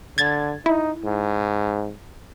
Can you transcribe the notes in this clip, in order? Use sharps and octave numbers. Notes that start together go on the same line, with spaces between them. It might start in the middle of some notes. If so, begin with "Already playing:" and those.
D3 G#6 A6
D#4 E4
G#2